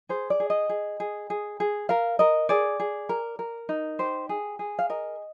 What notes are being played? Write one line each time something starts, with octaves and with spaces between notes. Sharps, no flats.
G#4 C5
D5
G#4
D#5
G#4
G#4
G#4
G#4
A#4 F5
A#4 D#5
G#4 D5
G#4
A#4
A#4
D#4
G4 C5
G#4
G#4
F5
A#4 D#5